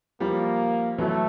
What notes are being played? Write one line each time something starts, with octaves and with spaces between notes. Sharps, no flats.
F3 G3 A#3
E3 F#3 A3